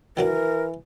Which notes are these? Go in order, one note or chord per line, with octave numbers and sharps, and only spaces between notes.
D#3 E3 F#3 D4 A#4